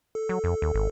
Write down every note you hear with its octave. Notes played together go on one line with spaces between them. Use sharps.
A4
F#3
F2
D#2
G#1